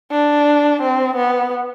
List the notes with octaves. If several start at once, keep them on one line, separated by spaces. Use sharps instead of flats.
D4
C4
B3